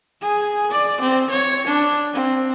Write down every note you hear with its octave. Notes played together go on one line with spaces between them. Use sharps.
G#4
D5
C4
C#5
D4
C4